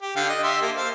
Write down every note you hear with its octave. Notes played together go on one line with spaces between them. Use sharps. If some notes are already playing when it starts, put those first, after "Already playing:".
G4
D3 F5 G5
D#5
G4 E5 C6
A#3 A4
C5 F5